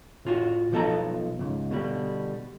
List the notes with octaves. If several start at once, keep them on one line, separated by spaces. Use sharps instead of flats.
A2 F4 F#4
B1 F3 B3 A4 D#5 A#5
C#2 G#2
B2 D3 G3